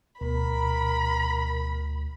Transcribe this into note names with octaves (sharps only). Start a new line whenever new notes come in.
D2 B2 A#4 B5